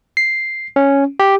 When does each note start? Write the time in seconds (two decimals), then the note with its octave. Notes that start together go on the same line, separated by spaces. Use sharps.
0.17 C7
0.76 C#4
1.20 G4